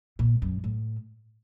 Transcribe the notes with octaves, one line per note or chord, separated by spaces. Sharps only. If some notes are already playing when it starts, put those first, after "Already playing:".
A#2
F#2
A2